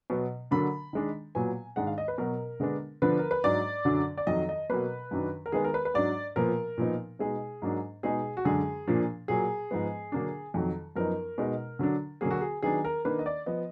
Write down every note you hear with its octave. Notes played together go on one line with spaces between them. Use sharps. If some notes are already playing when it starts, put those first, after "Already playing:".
B2 F#3 B3
D3 F#3 A#3 D4 B5
D#3 G#3 D4
A#2 F#3 B3 G#5
G#2 D#3 G#3 D4 F#5
F5
D#5
B4
B2 F#3 B3 A#4
D3 G#3 B3 D4
D3 F3 B3 D4 B4
A#4
B4
G#2 F#3 D4 D5
F#2 D3 F#3 D4
D5
F2 D#3 F#3 D#5
D#5
B2 F#3 A#3 B4
F#2 D#3 F#3 D4
A#4
D#3 G#3 B3 G#4
A#4
B4
B4
G#2 F#3 D4 D5
A#2 F3 B3 A#4
A#2 F3 B3 D#4
B2 G#3 D#4 G#4
G#2 F#3 A#3 D4
B2 G#3 D#4 G#4
F#4
F#2 D3 G#3 D4 G#4
A#2 F3 A#3 D4
A#2 F#3 A#3 G#4
G#2 F3 G#3 B3
D3 F#3 A#3 D4
F2 D#3 F#3
F#2 F3 B3 D#4 A#4
B2 G#3 D#4
D3 F#3 D4
D3 F#3 A#3 G#4
F#4
G#4
D#3 F#3 B3 D4 G#4
A#4
D#3 A#3 D4 B4
D#5
D5
F3 B3 D#5